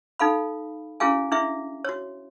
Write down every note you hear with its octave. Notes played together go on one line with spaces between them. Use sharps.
D#4 A4 F5 B5
C#4 E4 F#4 G#4 F5 G#5
D4 E4 G#4 E5
F#4 C#5